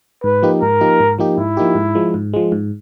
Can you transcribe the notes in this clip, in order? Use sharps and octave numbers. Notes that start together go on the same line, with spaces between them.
G#2 B4
F3 A#3 D#4 G4
G#2 A#4
F3 A#3 D#4 G4
G#2
F3 A#3 D#4 G4
G#2 E4
F3 A#3 D#4 G4
G#2
F3 G#3
G#2
F3 G#3
G#2